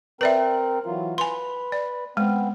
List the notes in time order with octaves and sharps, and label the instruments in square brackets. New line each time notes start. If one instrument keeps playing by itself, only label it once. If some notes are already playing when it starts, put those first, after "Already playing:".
[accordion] C4 A#4 [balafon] B4 D5 E5
[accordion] E3 F#3 F4
[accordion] B4 [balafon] G#5 C6
[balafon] D5
[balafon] G#3 [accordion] B3 C4